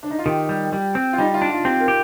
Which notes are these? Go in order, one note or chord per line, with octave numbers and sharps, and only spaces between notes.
D4
D#4
F4
D#3 G4
G3
G3
C4
F4
G3 D#4
F4
D4
F4
C4 G4
A#4
G4